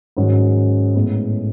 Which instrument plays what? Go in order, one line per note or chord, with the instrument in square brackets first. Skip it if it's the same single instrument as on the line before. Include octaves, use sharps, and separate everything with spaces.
[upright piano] G#2 D#3 F#3 C#4 F#4
A2 G#3 B3